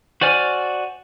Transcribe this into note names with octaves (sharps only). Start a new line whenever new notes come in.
F#4 C5 D5 G#5 F6